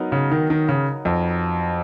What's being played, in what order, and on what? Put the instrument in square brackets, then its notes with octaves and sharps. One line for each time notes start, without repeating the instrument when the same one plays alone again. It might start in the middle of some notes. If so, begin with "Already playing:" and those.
Already playing: [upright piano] F#3 B3 D#4 A#4
[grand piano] C#3
D#3
D#3
C#3
F2